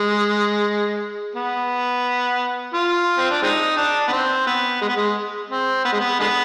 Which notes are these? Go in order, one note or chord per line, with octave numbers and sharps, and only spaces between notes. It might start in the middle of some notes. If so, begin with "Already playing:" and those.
Already playing: G#3
B3
F4
C4
D4
G#3 C4 D#4
D4
B3
C4
B3
G#3
B3
G#3
C4
B3
G#3
B3
D3 G#3 B3